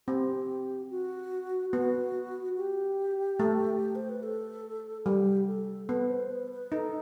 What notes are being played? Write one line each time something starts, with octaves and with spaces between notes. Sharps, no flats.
C4 G4
F#4
B3 F#4
G4
A3
C5
B4
A4
G3 G4
A4
B3 B4
C5
B4
B4
D#4 A4